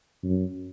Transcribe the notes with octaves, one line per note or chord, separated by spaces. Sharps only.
F#2